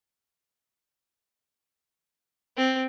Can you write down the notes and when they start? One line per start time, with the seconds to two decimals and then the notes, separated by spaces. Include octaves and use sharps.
2.57 C4